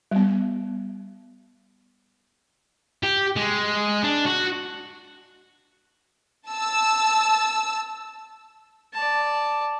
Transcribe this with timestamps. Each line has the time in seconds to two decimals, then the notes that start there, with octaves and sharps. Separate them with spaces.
0.11 G3 B3
3.03 G4
3.36 G#3
4.03 D4
4.26 F#4
6.50 A5 E6
8.93 D5 A5